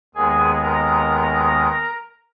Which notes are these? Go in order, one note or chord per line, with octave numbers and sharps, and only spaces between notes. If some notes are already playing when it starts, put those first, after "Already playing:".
D#2 D#3 G#3 B3 G#4 G#5
A#4 A#5